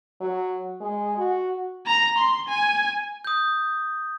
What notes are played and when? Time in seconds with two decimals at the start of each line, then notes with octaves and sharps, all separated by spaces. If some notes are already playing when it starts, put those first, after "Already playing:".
0.21 F#3
0.81 G#3
1.18 F#4
1.87 A#5
2.18 C6
2.48 G#5
3.25 D#6 G6